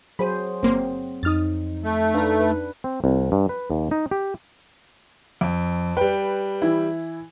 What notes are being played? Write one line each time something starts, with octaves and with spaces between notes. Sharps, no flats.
F#3 G#4 C5 B5 D#7
G1 A#3 C4 C6
F2 D#4 D#6 F6 A6
A3
D4 B4 F5 A#5
B4
C4
C2
G2
B4
D#2
D#4
G4
F2
G3 B4 G5
E3 E4